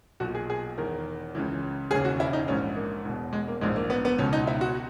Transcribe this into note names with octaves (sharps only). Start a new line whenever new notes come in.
B1 A#2 F#4
G#4
G#4
E1 E2 D#3 A#4
C#2 C#3 E3
E1 D#2 C#3 G#4
F#4
E4
D#4
A#1 G#2 E3 C#4
A#3
E1 E2 B2
G#3
A#3
A#1 G#2 E3 G#3
A#3
B3
B3
C#2 B2 C#4
D#4
E4
F#4